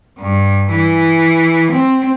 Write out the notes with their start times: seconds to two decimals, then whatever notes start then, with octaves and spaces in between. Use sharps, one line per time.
0.19 G2
0.71 E3
1.71 C4